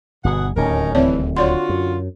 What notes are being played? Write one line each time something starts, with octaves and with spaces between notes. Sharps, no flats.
G1 B2 G#4 F#5
D1 D#2 A2 C#4 D#4 A#4
E3 C4 C#5 D5
D3 F4 F#4 C#5 D5 C6
F#2